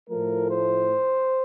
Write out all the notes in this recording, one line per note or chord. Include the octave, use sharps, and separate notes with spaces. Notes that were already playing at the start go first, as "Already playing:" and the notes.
A2 F3 A3 A#4
C5